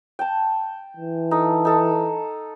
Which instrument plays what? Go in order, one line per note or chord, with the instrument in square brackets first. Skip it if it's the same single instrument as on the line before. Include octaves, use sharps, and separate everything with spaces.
[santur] G5 A5
[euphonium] E3
[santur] D#4 A4
D#4 A4